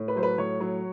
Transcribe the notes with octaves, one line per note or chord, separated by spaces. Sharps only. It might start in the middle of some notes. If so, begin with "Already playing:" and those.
Already playing: A2
B4
F#3 C5
B4
A2 C#5
F#3